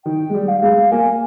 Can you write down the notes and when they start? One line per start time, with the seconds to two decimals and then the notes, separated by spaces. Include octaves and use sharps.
0.05 D#3 G5
0.30 G#3
0.34 G3
0.48 F5
0.62 G#3
0.91 A#3 G#5